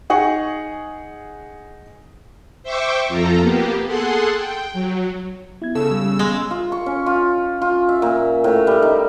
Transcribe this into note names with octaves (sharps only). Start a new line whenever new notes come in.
D#4 G#4 F#5 C#6
C5 E5 G5 C#6 D6
F2 F4 A4 A#5
A#3 B3 G4
G#4 A4 F#5 C6
G5
F#3
B3 E4 G#6
C#3 A4 E6
G3
G#3
F4
C#6
C#4
F4
F4
E5
A#2
A2
G3
D#4